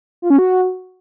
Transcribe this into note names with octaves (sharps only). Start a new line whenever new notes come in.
F4
C#4
F#4